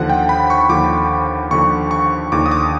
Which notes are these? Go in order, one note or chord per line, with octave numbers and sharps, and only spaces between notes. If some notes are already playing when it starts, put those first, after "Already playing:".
Already playing: D#2 D3 F3 F#5
G5
B5
C#6
D#2 D3 F3 D6
D#2 D3 F3 C#6
C#6
D#2 D3 F3 D6
D#6
D6